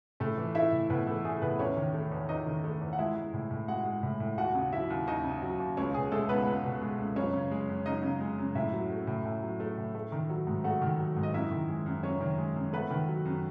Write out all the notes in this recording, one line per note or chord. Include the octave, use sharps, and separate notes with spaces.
A2 A3 A4
E3
A3 E4 E5
A2
A2 B3 B4
E3 A3 A4
A3 G#4
A2 B3 B4
E2 C#4 C#5
D#3
A3
E2
E2 D#4 D#5
D#3
A3
E2
F#5
G#3 E4 E5
G#3
A2
A2
G#3 F#4 F#5
G#3
A2
A2
D#2 F#4 F#5
C#3
F#3 E4 E5
D#2
D#2 D#4 D#5
C#3
F#3
D#2
C#2 C#4 C#5
B2 G#4
G#3 A3 A4
C#2 B3 B4
C#2
B2
G#3
C#2
F#2 C#4 C#5
C#3
G#3
F#2
F#2 D#4 D#5
C#3
G#3
F#2
A2 E4 E5
F#3
A3
A2
A2
F#3
A3
A2
A3
D#3
F#3
G#2
A3 F#4 F#5
D#3
F#3
G#2
D#5
F#2 E4 E5
D#3
G#3
F#2
F#2 C#4 C#5
D#3
G#3
F#2
A3 B3 B4
D#3
F#3
F#2